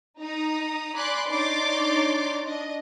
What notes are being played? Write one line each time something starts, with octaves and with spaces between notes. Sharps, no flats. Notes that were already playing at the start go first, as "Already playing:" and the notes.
D#4 A#5 D#6
D5 G#5 B5 C6 D6 F#6
D4 D#4 C#5 C6 D6 A6
D4 D#5